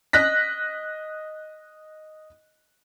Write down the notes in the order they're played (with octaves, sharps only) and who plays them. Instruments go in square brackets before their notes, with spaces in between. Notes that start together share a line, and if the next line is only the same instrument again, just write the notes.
[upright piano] D#5 F#6 A#6 B6